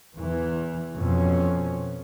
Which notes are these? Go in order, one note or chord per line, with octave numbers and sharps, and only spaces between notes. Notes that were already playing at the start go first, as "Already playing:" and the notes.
E2 E3
F2 B2 C#4